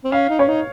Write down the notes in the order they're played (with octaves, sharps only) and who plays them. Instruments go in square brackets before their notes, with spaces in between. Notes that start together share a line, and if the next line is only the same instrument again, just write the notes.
[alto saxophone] C4
[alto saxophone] C#4 [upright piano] F5
[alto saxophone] D#4
[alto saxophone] C#4 [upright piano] C#5
[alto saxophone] D#4